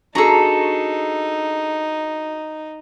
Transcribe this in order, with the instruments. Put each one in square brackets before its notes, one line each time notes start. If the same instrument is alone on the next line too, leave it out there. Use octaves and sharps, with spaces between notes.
[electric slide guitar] D4 F#4 G#4 [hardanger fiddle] D#4 [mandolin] A4 A#5